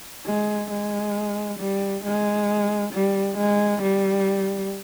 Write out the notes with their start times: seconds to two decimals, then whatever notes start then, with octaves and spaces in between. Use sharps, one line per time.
0.26 G#3
0.70 G#3
1.59 G3
2.04 G#3
2.93 G3
3.37 G#3
3.82 G3